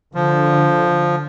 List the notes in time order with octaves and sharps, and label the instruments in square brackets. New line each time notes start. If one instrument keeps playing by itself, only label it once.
[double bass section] D3 [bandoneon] F3